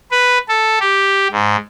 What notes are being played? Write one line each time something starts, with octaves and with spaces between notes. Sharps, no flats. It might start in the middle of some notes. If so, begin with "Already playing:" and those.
B4
A4
G4
G#2